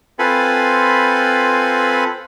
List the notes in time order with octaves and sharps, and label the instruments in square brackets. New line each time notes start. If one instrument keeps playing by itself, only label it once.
[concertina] C4 F4 A4 B4 G#5 B5